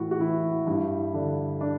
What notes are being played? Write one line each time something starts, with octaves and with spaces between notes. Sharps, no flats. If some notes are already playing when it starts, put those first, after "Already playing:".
Already playing: A2 E3 F#4
F#4
E3 E4
G2 E4
D3 D4
D4